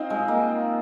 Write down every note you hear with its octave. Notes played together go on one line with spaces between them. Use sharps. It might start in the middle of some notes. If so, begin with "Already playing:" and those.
Already playing: C4 D#4 F4
G#3
A#3